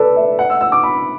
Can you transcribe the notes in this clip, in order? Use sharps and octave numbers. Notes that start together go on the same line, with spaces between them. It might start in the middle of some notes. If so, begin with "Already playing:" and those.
Already playing: A4 B4 D5
E5
F#5
E6
E6
D6
B5